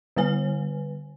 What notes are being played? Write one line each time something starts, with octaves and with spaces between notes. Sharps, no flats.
D3 G3 B4 G#5